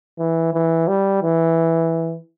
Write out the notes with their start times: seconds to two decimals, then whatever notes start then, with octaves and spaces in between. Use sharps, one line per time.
0.19 E3
0.54 E3
0.88 G3
1.23 E3